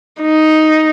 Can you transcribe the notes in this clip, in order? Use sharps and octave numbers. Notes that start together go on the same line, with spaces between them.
D#4